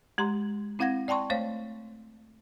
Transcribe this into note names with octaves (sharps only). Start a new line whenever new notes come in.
G#3 G4 A#5 C6
C4 E4 F5 F#5 G#6 A#6
D5 G5 A5 C6 C#6
A3 C5 C#5 F5